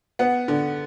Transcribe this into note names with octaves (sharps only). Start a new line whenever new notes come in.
B3 F#5
D3